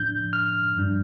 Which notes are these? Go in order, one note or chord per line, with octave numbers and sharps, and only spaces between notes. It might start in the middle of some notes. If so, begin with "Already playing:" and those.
Already playing: A2 F3 D4 G6
F6
G2 G3 D4